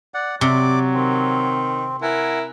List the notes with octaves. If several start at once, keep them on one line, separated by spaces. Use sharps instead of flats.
D5 F#5
C3 F#3 D5 D6
D#3 C4
E4 A#4 F#5 G#5